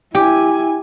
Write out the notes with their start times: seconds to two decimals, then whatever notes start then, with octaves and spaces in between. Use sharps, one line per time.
0.15 E4 G4 G#5